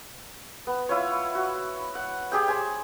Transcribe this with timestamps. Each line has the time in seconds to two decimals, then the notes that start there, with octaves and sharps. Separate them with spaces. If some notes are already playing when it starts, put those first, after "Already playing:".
0.67 B3
0.89 E4 F4 C#5
1.35 F#4
1.95 F#5
2.32 G4 G#4 G5
2.48 C5 G#5